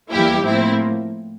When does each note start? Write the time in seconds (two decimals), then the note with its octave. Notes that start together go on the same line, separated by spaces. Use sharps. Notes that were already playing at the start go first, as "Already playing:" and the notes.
0.11 E2 E3 G3 A#3 E4 G4
0.45 A2 F3 A#3 C4 E4